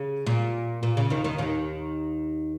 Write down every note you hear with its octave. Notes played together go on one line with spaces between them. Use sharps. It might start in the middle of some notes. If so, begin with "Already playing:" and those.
Already playing: C#3
A#2
A#2
C#3
D#2 D#3
D#2 D#3
D#2 D#3